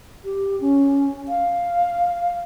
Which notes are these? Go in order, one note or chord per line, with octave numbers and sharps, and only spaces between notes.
G4
C#4
F5